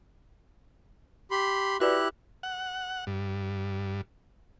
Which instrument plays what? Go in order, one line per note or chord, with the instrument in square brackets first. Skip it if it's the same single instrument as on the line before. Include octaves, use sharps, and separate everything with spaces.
[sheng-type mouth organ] G4 B5 C6
[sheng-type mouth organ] E4 G4 F#6 [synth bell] F#4 B4 D5
[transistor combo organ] F#5
G2